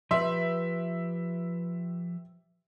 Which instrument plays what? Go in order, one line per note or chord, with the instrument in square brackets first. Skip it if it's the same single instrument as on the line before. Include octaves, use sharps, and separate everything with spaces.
[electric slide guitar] F3 G4 B4 [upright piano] E5 C6